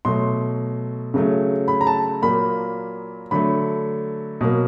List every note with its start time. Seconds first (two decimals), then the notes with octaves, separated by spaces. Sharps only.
0.05 B2 F#3 A3 C6
1.14 C#3 F#3 A3
1.68 B5
1.81 A#5
1.87 A5
2.22 A#2 F#3 A#3 B5
3.31 D3 F#3 A3 B5
4.41 B2 F#3 A#3